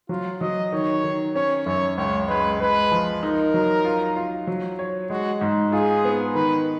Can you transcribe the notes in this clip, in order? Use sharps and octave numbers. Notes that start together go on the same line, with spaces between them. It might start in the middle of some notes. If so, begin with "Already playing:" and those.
F#3 F4
F#3 D#5
D#3 C#5
D#3
C#4 C#5
F#2 C#5
C#2 C#5
G#3 B4
G#3 B4
F3
D#4 A#4
F#3
F4
F4
F#3
C#5
G#3 F#4
G#2
F4 G#4
B3
D#3 B4